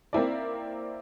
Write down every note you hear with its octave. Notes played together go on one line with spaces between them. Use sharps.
A#3 C4 E4 D5